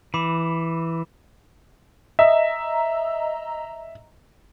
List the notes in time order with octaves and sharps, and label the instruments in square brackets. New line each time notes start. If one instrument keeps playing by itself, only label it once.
[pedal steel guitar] E3 [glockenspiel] B5 D6 E7
[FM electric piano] D#5 A#5 E6 [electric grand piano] E5